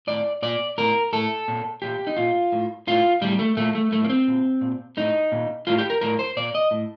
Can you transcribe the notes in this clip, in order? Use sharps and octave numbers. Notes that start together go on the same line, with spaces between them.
A2 D5
A#2 D5
A2 A#4
A2 A4
A#2
A#2 G4
D#4
A#2 F4
A2
A2 F4
A2 G3
A3
A#2 A3
A3
A2 A3
A#3
C4
A#2
A#2
A2 D#4
A#2
A2 F4
G4
A#4
A2 A#4
C5
A#2 D5
D#5
A2